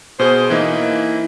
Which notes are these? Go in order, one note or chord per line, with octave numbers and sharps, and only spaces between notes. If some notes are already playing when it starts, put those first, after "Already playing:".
B2 G#4 C5
E3 A#3 D#4 E4